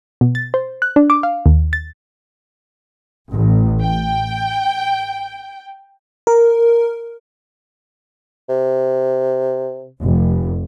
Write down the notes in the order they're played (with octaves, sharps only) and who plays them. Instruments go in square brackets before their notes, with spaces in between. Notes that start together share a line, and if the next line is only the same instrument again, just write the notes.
[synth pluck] B2
A6
C5
F#6
D4
D6
F5
D#2
A6
[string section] A1
G5
[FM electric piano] A#4
[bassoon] C3
[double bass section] F1